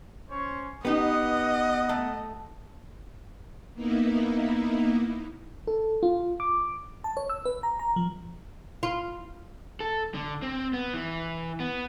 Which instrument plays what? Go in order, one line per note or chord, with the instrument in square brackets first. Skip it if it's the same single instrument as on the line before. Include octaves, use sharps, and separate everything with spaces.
[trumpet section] C#4 C5 C#5
[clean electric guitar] B3 [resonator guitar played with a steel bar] D#4 G4 B4 [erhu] D#5 [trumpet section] F#5
[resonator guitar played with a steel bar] A3
[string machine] A#3 B3 D#4 E4
[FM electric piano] A4
F4
D6
A5
C#5
E6
B4
A#5
A#5
F3
[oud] F4
[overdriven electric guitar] A4
D3
C4
B3
E3
B3